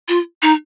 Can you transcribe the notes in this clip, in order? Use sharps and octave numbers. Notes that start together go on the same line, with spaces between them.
F4
D#4